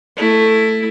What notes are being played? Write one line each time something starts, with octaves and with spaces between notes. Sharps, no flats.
A3 E4